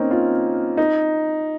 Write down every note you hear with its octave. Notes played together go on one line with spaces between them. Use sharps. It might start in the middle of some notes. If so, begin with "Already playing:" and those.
Already playing: A#3 C4 C#4 D#4
F4
D#4